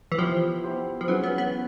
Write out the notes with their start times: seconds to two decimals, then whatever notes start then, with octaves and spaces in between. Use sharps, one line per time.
0.12 E3
0.18 F3 B3 E4 G4 C5
0.64 B3 E4 G4 C5
1.01 F3
1.08 E3 F#3 G#3 C#4 F#4 B4
1.24 B3
1.38 B3